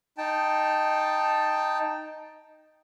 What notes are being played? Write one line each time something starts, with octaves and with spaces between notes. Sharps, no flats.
D#4 G5 A5